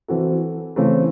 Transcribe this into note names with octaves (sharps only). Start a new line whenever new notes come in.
E3 C4 F#4 A4
C#3 E3 A3 C4